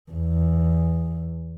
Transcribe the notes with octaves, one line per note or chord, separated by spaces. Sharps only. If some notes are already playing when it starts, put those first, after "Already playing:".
E2